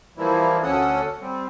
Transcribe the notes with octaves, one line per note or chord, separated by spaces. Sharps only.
E3 F3 G3 A#3 E4
D2 C#4 A4 F#5 D#6
G3 C4